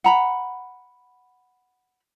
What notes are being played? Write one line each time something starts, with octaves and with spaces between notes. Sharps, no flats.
F#5 A#5 B5